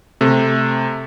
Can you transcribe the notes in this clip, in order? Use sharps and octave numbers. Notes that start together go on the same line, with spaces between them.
C3 A3